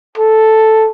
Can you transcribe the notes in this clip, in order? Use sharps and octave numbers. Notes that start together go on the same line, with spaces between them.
A4